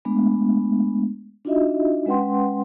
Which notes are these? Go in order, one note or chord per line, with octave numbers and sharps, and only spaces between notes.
G#3 A3 B3 D4
D4 D#4 F4 F#4 D#5 E5
G#3 C#4 B4 F#5 G5 C6